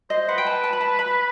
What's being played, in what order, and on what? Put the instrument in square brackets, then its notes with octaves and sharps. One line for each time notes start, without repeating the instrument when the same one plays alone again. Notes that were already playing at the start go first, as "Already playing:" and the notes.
[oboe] C5 [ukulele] D#5
[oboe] B4 [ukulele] F#5
[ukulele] G5
A5
A5
B5
A5
B5